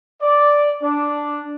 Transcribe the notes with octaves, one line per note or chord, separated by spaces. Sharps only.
D5
D4